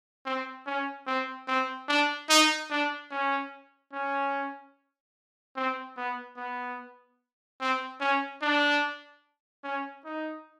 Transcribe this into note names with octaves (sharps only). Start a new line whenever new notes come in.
C4
C#4
C4
C4
D4
D#4
D4
C#4
C#4
C4
B3
B3
C4
C#4
D4
C#4
D#4